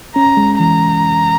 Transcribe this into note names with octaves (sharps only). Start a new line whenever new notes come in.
C#4 A#5
G#3
E3 A#5